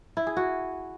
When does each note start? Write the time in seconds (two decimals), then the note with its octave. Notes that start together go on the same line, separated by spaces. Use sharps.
0.17 E4
0.27 G#4
0.37 F#4